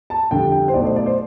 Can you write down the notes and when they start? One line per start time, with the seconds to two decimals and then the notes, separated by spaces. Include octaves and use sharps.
0.10 A5
0.31 F2 D3 G3 G5
0.52 G5
0.68 C5
0.74 B1 B2 A3 D5
0.85 C5
0.96 D5
1.06 C5